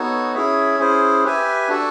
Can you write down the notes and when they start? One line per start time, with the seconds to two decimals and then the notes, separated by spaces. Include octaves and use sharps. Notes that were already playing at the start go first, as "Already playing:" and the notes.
Already playing: B3 D#4 F#4 A4 C#5
0.34 C#4 E4 G#4 C#5 E5
0.79 C#4 E4 G#4 C5
1.24 G4 B4 E5 G#5
1.69 D4 F#4 A4 D5